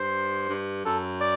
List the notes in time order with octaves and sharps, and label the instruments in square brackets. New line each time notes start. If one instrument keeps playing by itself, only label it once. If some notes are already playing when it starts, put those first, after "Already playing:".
Already playing: [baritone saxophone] G2 [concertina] C5
[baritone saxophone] G2
[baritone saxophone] F#2 [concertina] A4
[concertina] D5